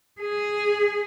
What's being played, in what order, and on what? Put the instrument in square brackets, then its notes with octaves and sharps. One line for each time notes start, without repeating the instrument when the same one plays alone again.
[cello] G#4